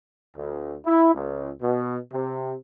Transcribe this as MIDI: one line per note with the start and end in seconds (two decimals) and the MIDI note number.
0.36 0.75 38
0.85 1.14 64
1.14 1.49 37
1.62 1.96 47
2.10 2.53 48